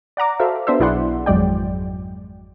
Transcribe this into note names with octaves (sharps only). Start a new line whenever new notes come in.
D5 F#5 A#5 D6
F#4 A4 C5 E5 F5
B3 D4 C5 E5
B1 E4 G#4 D5 F#5 C6
G#1 F2 F#3 G#3 D5 G5